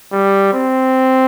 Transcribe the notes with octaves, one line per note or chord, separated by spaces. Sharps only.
G3
C4